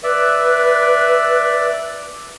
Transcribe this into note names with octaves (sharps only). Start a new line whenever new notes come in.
B4 D5 E5